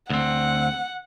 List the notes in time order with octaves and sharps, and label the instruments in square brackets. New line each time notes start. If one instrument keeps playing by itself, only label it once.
[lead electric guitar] D2 C4 [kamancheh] F#5